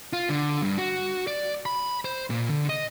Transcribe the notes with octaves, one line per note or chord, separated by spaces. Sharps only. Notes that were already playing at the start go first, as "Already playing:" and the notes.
F4
D3
G2
F#4
D5
B5
C5
A#2
D3
D#5